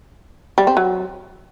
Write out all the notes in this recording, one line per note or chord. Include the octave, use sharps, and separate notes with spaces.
G3
C4
F#3